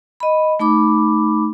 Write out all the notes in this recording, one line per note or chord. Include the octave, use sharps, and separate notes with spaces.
D#5 B5
A3 D#4 B5 D6